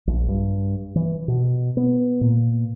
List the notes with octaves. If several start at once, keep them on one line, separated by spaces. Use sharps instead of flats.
A#1
G2
E3
B2
B3
A#2